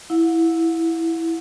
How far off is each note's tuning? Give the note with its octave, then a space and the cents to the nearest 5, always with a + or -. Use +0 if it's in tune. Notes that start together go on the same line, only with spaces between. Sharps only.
E4 +0 F#5 -40